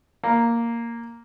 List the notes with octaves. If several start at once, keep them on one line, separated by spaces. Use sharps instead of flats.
A#3